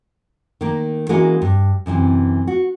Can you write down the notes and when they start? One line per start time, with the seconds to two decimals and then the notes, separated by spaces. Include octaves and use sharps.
0.61 D#3 A#3
1.09 E3 G#3 A#3 C#4 F#4 A#4
1.42 G2
1.86 F#2 C3 D#3 E3
2.47 F#4